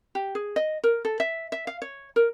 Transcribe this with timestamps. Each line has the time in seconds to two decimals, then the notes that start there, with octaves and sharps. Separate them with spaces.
0.15 G4
0.35 G#4
0.56 D#5
0.84 A#4
1.05 A4
1.20 E5
1.52 E5
1.67 F5
1.82 C#5
2.16 A#4